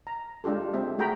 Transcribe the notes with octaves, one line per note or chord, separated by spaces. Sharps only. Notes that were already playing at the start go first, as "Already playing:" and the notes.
A#5
G#3 D4 F4 G4 A4
G#3 C4 E5
A3 F#4 G#4 G5 A#5 B5